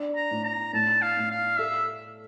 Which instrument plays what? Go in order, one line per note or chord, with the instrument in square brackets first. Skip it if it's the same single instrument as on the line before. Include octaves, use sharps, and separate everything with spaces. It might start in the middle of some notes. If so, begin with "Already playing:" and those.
Already playing: [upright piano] D4
[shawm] A#5
[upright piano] A2
[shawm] A#5
[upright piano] A2 [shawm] A5
[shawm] F5
[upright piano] A2
[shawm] F5
[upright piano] A4 [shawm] E5